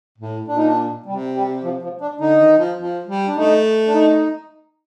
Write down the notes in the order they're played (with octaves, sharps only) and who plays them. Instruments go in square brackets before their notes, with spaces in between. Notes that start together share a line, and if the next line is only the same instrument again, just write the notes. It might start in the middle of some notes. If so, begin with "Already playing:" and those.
[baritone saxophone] A2
[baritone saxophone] A#2 [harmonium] D4
[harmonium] D#4
D4
[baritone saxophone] C3 [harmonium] G3
[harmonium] G3
F3
F3
D4
[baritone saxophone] D3 [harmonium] D#4
[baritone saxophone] D#3
F3
F3
G3
[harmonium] D4
[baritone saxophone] A3 [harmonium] D#4
[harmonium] D4
D#4